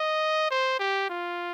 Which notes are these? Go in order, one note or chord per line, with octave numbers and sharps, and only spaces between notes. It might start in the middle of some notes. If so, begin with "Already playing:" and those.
Already playing: D#5
C5
G4
F4